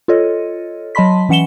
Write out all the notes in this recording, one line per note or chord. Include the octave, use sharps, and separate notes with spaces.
F4 A4 C#5 D#5
F#3 D#5 A5 B5 C6 B6
E3 C#4 F#5 C#7 E7 G7